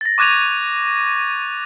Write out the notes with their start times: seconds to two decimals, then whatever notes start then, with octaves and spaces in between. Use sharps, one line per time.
0.01 A6 A#6
0.18 C#6 D6 F#6 G#6 D#7 F7